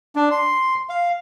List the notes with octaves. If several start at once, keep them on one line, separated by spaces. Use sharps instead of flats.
D4
C6
F5